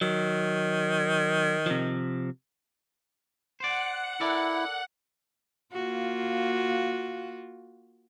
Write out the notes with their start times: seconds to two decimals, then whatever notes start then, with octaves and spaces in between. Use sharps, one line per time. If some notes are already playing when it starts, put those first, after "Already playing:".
0.01 D#3 F#3
1.66 C3 F3
3.60 C5 D5 F#5
4.21 E4 A4 A#4 D5
5.72 A#3 F4 F#4